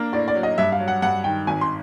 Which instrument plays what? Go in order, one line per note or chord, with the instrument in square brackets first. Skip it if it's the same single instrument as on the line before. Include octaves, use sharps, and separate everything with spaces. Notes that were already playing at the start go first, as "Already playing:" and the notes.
Already playing: [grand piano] A#3 D4
[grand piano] A2 [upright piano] D5
[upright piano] D5
[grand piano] F#3
[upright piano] D#5
[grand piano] G2 [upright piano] E5
[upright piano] F5
[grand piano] F#3
[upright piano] F#5
[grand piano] G2 [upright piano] F#5
[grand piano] D#3 [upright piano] G5
[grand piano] G#1 [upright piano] G#5
[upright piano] C6